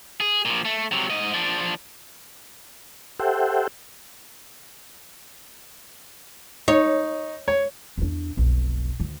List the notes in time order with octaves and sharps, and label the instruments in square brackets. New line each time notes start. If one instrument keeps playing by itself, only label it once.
[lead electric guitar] G#4
A#2 F3
A3
C3 F#3
G#2 D#5
F3 D4
[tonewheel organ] G4 A4 C5 E5 F#5 G5
[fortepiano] D#4 [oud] C#5
[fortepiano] C#5
[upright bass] E2 D4
F1 B1
D2 D3